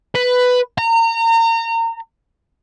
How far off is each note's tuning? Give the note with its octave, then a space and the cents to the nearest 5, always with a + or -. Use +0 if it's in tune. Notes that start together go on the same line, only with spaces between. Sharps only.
B4 +10
A#5 -30